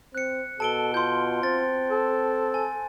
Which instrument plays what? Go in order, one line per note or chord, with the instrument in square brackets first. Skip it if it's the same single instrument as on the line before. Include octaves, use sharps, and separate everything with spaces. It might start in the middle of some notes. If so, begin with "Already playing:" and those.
[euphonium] C4 [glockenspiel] F#6 C#7
[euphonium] B2 [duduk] A4 [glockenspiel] A5 D7 G7
[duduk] F4 [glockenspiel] C6 G6
[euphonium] C4 [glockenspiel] A6
[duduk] A4
[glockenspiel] G#5